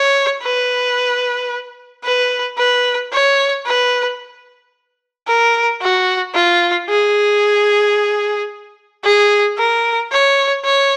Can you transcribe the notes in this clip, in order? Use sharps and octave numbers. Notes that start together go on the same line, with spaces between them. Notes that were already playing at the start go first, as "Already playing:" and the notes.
Already playing: C#5
B4
B4
B4
C#5
B4
A#4
F#4
F4
G#4
G#4
A#4
C#5
C#5